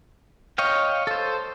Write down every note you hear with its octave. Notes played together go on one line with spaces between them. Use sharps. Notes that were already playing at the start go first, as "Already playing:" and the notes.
C#5 D#5 F5 G5
A4 C5